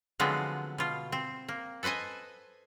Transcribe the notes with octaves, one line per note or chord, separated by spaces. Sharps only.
D3 F3 F#3 G#3 B3 C4
B2 F4
C4
A#3
A4 B4 C5 D#5 G#5